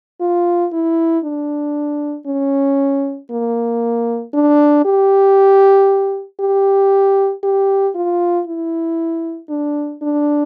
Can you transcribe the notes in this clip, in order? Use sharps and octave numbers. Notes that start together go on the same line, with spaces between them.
F4
E4
D4
C#4
A#3
D4
G4
G4
G4
F4
E4
D4
D4